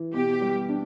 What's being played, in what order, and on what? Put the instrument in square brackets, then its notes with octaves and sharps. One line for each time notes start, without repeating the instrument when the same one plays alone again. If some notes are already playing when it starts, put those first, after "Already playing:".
Already playing: [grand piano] E3
[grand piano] B2 [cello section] G4
[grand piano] G3
D4